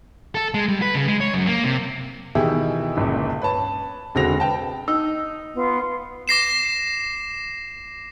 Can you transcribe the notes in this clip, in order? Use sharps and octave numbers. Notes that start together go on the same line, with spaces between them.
A4
G#3
G3
B4
C#3
G#3
C#5
F#2
A#3
C3
B2 D#3 E3 E4 G4 G#4
G1 C#2 A#2
B4 C#5 A5
E1 D3 C4 F#4 A#6 F7
B4 G5 A5
D#4 E6
B3 F4
D6 A#6 C7 E7